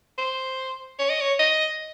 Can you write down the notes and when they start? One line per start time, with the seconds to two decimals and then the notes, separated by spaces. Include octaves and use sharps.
0.18 C5
0.99 C#5
1.09 D#5
1.21 C#5
1.39 D#5